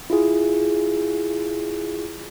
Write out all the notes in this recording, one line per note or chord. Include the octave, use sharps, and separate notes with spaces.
E4 F4 G#4